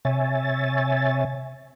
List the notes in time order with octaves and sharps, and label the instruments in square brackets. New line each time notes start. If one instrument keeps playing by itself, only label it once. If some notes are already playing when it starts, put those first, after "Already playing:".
[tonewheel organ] C3 C#5 E5 G#5 A6